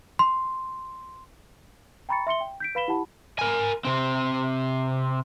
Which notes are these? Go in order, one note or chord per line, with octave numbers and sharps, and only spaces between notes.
C6
G5 A#5 B5 C#6 A6 C#7
E5 C6 C#7 G7
G5
G6 B6 D7
B4 F5 B5 B6 E7 G7
E4 G4 F#5 A5 B5
A#4 G#5
C3 C4